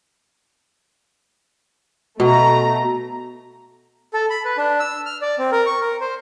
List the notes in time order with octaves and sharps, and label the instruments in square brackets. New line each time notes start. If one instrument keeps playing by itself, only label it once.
[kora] B2 [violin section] A3 A#5
[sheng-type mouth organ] A4
B5
B4
D4
E6
F6
D5
C4
A#4
C#6
A#4
C5